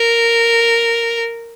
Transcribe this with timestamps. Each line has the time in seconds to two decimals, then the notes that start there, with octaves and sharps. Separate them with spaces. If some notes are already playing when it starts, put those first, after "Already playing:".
Already playing: A#4